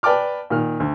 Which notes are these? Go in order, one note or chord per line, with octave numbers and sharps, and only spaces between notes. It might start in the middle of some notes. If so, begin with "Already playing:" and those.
B4 D5 G5 A5 D6 F6
A#2 D#3 F6
D2